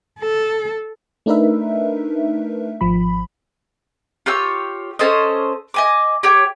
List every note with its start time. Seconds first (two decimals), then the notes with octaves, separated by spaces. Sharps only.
0.20 A4
1.26 A3 D4 D#4 A#4 B4 E5
2.81 G#1 F3 B5
4.26 F4 G4 C#5 E6
4.99 C#4 A4 C5 D#5
5.74 D#5 G#5 D6
6.23 G4 C#5 G5